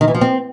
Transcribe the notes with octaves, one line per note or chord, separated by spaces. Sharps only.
D#3
E3
F3
C4